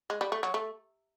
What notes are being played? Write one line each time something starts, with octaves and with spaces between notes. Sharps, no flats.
G#3
G3
A3
F#3
A3